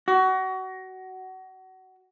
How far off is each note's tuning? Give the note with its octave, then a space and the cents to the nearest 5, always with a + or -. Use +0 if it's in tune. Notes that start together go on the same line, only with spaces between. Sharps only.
F#4 +25